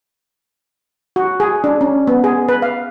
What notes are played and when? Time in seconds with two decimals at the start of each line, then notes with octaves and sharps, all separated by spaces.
1.16 F#4
1.40 G#4
1.64 D4
1.81 C#4
2.07 B3
2.24 G#4
2.49 B4
2.62 F5